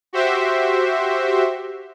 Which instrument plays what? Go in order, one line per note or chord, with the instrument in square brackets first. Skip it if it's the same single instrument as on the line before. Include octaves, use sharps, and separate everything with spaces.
[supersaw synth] F#4 G4 C5 E5